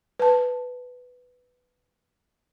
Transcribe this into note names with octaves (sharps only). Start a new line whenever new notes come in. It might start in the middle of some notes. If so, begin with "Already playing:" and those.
B4 A5